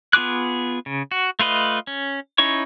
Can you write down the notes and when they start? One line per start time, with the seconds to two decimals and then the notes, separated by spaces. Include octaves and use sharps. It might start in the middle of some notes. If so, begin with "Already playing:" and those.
0.13 B3 F4 G#4 D6 F#6
0.86 C#3
1.11 F#4
1.39 A3 F4 B4 D#5
1.87 C#4
2.38 C#4 D#4 E4 C#5 C#6